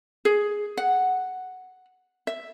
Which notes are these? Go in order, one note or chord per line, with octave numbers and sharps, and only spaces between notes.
G#4
F#5
E5